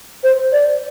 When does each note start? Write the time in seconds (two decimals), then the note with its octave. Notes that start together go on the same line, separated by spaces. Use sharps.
0.24 C5
0.52 D5